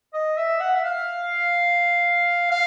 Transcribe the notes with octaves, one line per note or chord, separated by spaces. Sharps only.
D#5
E5
F#5
E5
F5
F5